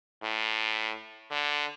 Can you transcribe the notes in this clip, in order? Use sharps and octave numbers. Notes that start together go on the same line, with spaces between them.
A2
D3